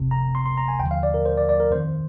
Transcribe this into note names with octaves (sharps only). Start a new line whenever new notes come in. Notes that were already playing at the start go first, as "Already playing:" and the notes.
Already playing: G1 F2 C3
A#5
C6
C6
A#5
G#5
D#2 D3 F3 G5
F5
D5
A#4
C5
D5
D5
A#4
F2 D#3 C5